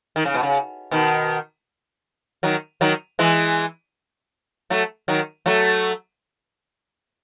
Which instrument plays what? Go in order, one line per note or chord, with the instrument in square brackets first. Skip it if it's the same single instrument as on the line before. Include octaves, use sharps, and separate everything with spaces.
[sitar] D#3
C#3
B2
C#3
B2 D#3
D#3 F#3
D#3 F#3
E3 G#3
F#3 A3
D#3 F#3
F#3 A3